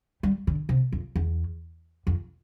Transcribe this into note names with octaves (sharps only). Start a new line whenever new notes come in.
G3
D3
C3
F2
E2
F2